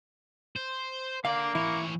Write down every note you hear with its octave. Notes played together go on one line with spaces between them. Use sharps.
C5
D3 A#3 D5 F5
E3 E4 C#5